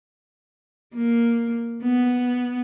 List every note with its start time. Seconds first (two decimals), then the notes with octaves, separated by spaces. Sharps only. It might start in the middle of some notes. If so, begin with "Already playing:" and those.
0.94 A#3
1.82 B3